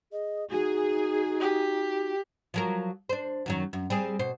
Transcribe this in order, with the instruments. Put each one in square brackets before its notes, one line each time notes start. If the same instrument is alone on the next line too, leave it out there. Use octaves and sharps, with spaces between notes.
[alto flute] G#4 [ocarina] D#5
[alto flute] D#4 [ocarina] F#4 [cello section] G#4
[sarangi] G4
[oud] F3 F#3 A#4
D4 C5
F#2 D#3 F#3
F#2
G3 C4 G#4
B2 C5